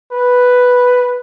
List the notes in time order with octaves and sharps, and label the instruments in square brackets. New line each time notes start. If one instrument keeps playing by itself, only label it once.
[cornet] B4